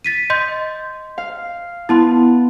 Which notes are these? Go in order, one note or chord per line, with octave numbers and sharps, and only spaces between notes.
A6 B6 D#7
D#5 C6 G6
F5
B3 E4 A5 C6